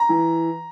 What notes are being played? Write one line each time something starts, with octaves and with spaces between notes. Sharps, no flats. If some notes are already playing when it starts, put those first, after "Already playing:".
Already playing: A#5
E3